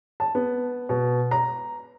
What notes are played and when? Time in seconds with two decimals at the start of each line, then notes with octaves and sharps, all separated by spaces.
0.20 A5
0.35 B3
0.89 B2
1.31 A#5